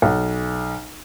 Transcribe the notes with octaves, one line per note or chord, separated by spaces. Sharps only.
B1